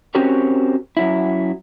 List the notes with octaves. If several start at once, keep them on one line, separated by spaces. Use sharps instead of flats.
C4 C#4 F#4 G4 A#4 C#5
F#2 F#3 E4